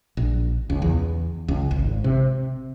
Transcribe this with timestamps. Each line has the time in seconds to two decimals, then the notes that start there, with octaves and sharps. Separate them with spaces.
0.17 A#1
0.70 C#2
0.82 E2
1.48 C#2
1.71 G#1
2.04 C3